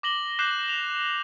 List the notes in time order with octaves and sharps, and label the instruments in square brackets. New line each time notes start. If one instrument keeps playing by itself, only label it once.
[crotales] D6 A#6 F#7 G7
D6 F#6 G6 A#6 C7 E7
F7